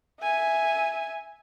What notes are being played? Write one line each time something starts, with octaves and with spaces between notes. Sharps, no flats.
E5 G#5